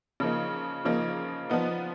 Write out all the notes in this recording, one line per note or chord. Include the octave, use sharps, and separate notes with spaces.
C#3 F3 A#3 D#4
C#3 F3 A#3 D#4
F3 B3 D#4